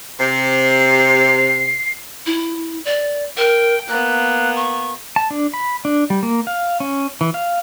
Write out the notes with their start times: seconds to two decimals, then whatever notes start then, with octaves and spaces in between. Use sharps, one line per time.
0.20 C3 C7
2.26 E4
2.85 D5
3.38 A#4 G5
3.88 A#3 B3 F#6
4.56 C#6
5.16 A5
5.31 D4
5.54 B5
5.85 D4
6.10 G3
6.23 A#3
6.47 F5
6.80 C#4
7.21 E3
7.34 F5